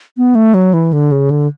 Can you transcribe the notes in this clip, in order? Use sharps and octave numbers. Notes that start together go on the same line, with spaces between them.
B3
A3
F#3
E3
D3
C#3
D3